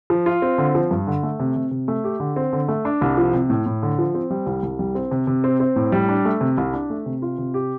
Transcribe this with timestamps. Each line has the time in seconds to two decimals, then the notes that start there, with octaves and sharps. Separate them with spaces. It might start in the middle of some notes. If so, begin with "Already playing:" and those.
0.10 F3
0.26 F4
0.42 C4
0.58 D3
0.75 F3
0.91 G2
1.07 D3
1.23 A3
1.40 C3
1.56 C3
1.71 C3
1.88 A3
2.04 G4
2.20 D3
2.36 C4
2.53 D3
2.68 A3
2.85 D4
3.01 C2
3.17 F3
3.33 C3
3.50 A2
3.66 A2
3.83 D3
3.99 F3
4.14 C4
4.30 G3
4.46 C2
4.63 C2
4.79 G3
4.95 C4
5.11 C3
5.27 C3
5.44 C4
5.60 C4
5.76 A2
5.92 G3
6.09 D4
6.25 A3
6.41 C3
6.58 C2
6.74 D4
6.90 A3
7.06 C3
7.22 F4
7.38 C3
7.54 G4